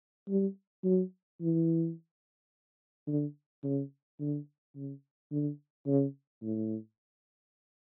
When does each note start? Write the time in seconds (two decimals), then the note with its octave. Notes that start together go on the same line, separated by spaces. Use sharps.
0.29 G3
0.84 F#3
1.41 E3
3.07 D3
3.63 C#3
4.20 D3
4.75 C#3
5.32 D3
5.87 C#3
6.42 A2